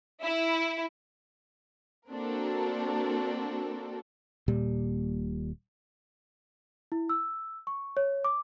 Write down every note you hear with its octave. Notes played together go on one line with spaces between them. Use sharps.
E4
A#3 C4 D4 F#4 A4 A#4
D#1 A#2 G3
E4
E6
C#6
C#5
D6